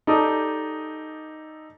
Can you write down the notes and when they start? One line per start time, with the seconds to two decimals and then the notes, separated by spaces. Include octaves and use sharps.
0.07 D#4 G4 A4 D5 A#5 D#6